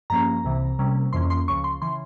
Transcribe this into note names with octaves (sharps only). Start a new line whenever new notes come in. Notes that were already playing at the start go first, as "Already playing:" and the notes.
G2 F3 A#3 C#4 A#5
C2 C3 E3
C3 G3 A#3 C#4
F2 E3 A#3 C#4 C6
C6
C#2 C#3 F3 C#6
C6
C#3 E3 C6